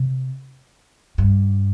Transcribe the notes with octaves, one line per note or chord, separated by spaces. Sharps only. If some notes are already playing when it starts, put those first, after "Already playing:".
Already playing: C3
G2